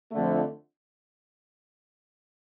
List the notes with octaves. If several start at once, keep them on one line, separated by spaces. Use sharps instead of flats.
F2 D3 A3